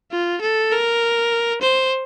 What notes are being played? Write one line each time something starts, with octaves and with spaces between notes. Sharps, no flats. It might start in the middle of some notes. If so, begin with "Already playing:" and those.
F4
A4
A#4
C5